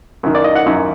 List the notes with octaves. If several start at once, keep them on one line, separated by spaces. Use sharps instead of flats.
F#2 D#3
D5
D#5
F#5
F#2 D#3